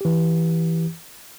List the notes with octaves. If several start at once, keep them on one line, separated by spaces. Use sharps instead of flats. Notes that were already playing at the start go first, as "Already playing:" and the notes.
E3 G4